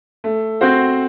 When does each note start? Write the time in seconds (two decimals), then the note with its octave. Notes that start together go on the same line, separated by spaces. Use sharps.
0.24 A3
0.61 C4 F#4 C5